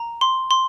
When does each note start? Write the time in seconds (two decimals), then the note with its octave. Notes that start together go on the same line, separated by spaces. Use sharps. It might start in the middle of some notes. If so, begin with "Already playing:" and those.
Already playing: A#5
0.21 C6
0.51 C6